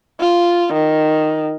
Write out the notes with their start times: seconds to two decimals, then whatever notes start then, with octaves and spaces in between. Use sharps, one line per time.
0.21 F4
0.74 D#3